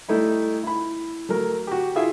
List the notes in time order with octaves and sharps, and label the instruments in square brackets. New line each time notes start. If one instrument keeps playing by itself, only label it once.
[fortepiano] G3 A3 D#4 E4
E4 B5
F#3 A3 A#4
F#4 G4
E4 F4 G#4 E5